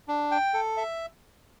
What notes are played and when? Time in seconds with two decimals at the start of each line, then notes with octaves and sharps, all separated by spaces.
0.08 D4
0.31 G5
0.54 A4
0.77 E5